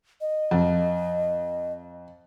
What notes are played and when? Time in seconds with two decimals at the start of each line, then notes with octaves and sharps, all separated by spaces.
0.21 D#5
0.51 F2